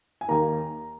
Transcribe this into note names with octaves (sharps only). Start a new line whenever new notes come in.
G#5
D#2 D#3 A#3 A#5